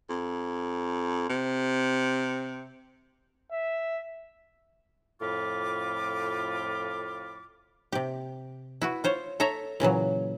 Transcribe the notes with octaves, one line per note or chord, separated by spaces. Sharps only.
F2
C3
E5
F2 A2 F4 B5 D6
C3 G4
E4 F#4 B4
F4 C5 C#5
A4 C#5 E5 A#5
A#2 C#3 E3 F#3